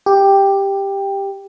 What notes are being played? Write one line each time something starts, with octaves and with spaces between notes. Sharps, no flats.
G4